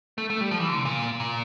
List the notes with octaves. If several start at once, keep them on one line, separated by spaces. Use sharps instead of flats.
A3
A3
G3
F3
E3
D3
C3
A#2
A#2